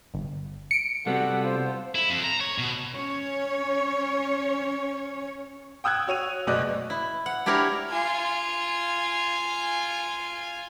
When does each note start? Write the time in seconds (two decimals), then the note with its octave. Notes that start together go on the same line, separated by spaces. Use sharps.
0.14 G1
0.71 C#7 D7
1.06 C3 G3 B3 F#4 A4 F#5
1.42 F4 C5
1.95 E4
2.10 F2
2.24 A#5
2.40 C#5
2.58 B2
2.92 C#4 C#5
5.84 G5 D#6 E6 F#6 G#6
6.07 F#4 C#5 D#7 F7
6.47 F#1 B2 D5 D#5 F#6
6.90 E4
7.26 F#5
7.46 D4 E4 G4 A#4 C#5
7.90 F4 G#5